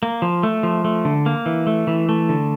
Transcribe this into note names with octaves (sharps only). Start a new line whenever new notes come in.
A#3
F3
A3
F3
A3
D3
A#3
E3
A3
E3
A3
D3